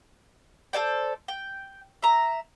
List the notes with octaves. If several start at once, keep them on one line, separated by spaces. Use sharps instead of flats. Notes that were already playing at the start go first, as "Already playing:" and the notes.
A4 C5 D5 G5
G5
E5 A#5